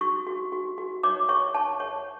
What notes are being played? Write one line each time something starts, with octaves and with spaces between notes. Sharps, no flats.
F#4 C#6
F#4
F#4
F#4
C#5 D6
C#5 C#6
C#5 A5
C#5